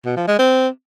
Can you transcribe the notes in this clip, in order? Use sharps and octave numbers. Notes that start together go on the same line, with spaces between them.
B2
F3
G#3
C4